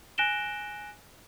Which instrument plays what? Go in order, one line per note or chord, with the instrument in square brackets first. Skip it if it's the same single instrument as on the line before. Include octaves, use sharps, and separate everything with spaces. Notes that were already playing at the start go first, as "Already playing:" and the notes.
[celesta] G#5 F#6 A#6 D7 E7 G7